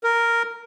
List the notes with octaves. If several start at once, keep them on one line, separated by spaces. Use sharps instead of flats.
A#4